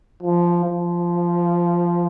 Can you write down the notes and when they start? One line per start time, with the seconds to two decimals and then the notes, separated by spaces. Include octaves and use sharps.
0.23 F3
0.65 F3